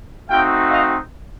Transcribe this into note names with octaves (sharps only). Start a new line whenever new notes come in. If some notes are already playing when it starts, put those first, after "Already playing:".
A3 C4 D#4 F#4 F5 G5
D#5 F5